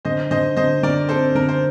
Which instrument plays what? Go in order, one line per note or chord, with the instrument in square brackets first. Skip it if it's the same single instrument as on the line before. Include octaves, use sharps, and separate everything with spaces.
[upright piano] D3 [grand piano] C5 D#5
[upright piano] D3 [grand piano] C5 D#5
[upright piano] D3 [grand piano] C5 D#5
[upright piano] D3 [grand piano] A#4 D5
[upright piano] C4 [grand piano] A4 C5
[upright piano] D3 [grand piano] A#4
[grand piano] C5